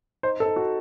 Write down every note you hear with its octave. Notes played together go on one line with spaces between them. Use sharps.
D#4 C5
A4
D#4
F#4